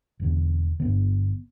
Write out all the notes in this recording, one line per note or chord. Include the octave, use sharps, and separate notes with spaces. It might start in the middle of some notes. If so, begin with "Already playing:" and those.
E1 E2 D3
G1 G2 D3 B3